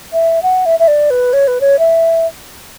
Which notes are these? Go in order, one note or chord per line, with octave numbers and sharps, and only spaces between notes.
E5
F#5
E5
E5
D5
B4
C#5
B4
C#5
E5